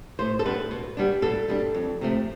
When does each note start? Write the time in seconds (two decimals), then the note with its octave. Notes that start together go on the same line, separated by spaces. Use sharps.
0.19 A2 C5
0.39 A4
0.45 G3 B3 D4 B4
0.71 B2
0.97 G3 B3 D4
1.22 B2 A4
1.48 G3 B3 D4
1.75 F2
2.01 C3 F3 A3